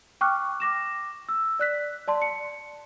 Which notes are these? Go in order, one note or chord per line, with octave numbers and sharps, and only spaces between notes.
G5 C#6 D6 F6 F#6
D6 A#6 E7
E6
D5 F#6 B6
D5 A5 C6
C#7